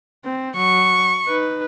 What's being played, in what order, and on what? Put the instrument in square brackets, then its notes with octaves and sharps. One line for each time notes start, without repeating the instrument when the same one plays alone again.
[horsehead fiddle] C4
[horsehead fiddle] F#3 [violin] C#6
[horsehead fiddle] D#4 B4